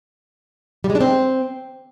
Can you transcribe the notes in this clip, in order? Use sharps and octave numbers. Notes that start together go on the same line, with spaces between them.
G3
G#3
D4
C4